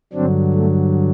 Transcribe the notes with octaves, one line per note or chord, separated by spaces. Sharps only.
G2 D3 F#3 C4 D4
A3